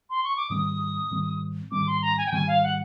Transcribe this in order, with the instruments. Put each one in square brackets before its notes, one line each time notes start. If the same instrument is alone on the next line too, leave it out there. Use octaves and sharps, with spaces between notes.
[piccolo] C6
C#6
D6
[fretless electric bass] G#2 D#3 G3 C4 [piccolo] D#6
[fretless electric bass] G#2 D#3 G3 C4
[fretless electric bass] G#2 D#3 G3 C4 [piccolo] D6
[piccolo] C6
A#5
G#5
G5
[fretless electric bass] G#2 D#3 G3 C4 [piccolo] G#5
[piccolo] F5
F#5